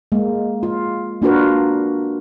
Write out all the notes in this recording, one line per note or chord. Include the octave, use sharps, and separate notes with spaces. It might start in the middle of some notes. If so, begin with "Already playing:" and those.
G#3 A#3
F4
A#3 D4 F4 F#4 A#4 B4